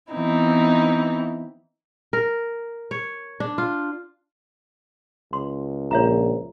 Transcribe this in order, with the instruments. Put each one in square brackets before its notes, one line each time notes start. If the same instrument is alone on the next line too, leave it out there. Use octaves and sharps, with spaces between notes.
[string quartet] E3 B3 C4 D#4 E4
[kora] A#4
C#5
D4
F4
[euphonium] C#2 [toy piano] C6
[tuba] A#1 [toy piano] C#5 E5 A#5